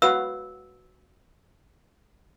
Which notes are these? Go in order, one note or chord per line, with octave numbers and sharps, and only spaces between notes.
F#4 B4 F5 E6